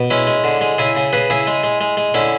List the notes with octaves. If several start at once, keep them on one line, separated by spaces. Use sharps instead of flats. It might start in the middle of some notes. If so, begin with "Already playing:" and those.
Already playing: B2
G#3 C#4 E4
G#3
D3
G#3
C#3 E4 G#4
C#3
C#3 G#4 B4
C#3 E4 G#4
G#3
G#3
G#3
G#3
D3 C#4 E4